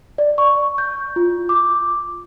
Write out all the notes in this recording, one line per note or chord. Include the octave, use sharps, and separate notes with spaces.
D5
C#6
G6
F4
D6